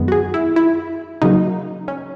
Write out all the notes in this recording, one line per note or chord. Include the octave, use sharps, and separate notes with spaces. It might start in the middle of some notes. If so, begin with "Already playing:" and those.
Already playing: F#2 D#3 G#3 B3
F#4
G#4
E4
E4
C#3 F#3 A#3 D#4
C#4